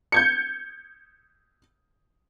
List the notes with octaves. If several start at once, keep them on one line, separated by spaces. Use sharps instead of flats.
G6 G#6 C#7